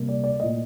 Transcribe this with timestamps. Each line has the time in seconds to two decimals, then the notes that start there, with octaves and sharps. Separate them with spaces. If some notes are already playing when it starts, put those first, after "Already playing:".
Already playing: C3 G3 A#3
0.09 D5
0.24 D5
0.40 A#2 A3 D#5